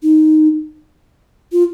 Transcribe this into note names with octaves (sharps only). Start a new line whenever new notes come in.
D#4
F4